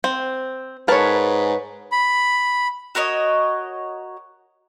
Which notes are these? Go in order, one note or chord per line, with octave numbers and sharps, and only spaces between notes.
C4
G#2 A#4 B4 C#5 A5
B5
F#4 A#4 C#5 D#5